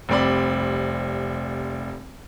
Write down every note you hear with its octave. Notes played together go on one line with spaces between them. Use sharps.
F1 G3 C4 D5 B5